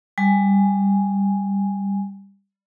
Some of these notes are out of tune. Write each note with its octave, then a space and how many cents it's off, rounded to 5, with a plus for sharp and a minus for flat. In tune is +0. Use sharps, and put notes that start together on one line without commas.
G3 +10 G#5 +0